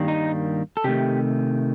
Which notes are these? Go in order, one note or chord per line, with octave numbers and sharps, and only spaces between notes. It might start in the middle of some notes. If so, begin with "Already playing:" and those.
Already playing: G2 D#3 G3 A#3
D#4
A4
C3 D#3 A3 G4